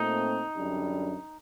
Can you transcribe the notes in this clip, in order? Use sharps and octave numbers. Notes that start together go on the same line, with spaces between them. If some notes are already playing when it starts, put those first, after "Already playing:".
Already playing: A#2 A3 C4 D#4
F#2 D3 G3 D4